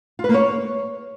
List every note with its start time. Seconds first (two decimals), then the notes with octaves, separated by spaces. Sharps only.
0.19 F4
0.24 B4
0.29 A#3
0.34 C#5